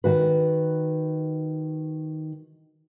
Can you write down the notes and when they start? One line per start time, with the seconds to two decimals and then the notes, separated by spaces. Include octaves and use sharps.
0.04 D#3 F#4 B4